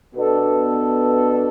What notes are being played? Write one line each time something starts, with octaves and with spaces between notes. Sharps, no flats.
B2 B3 D4 A4